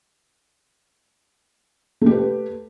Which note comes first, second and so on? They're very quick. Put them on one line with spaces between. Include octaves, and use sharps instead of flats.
A3 G4 B4